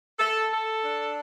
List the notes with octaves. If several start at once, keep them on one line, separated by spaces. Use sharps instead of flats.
A4
A4
D4